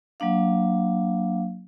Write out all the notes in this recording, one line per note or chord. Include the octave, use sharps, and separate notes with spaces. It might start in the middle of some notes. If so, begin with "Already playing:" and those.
F#3 A#3 D4 F5